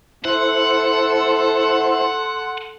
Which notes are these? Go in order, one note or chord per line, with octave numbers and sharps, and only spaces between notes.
E4 A4 C5 F#5 C6